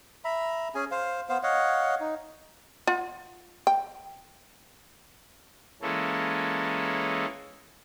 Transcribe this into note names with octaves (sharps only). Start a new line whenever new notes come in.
E5 A#5 B5
C#4 G#4 G#5
C5 F5
B3 C5 F5
C#5 D#5 F5 F#5
D#4
F4 F#5
G5
E3 G#3 A#3 C#4 A4